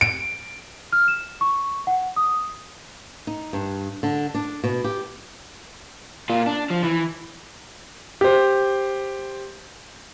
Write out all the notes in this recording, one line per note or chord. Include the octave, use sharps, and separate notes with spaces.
D7
F6
E7
C#6
F#5
D#6
D#4
G2
D3
D4
B2
G4
A#2 F4
D4
F3
E3
G4 C5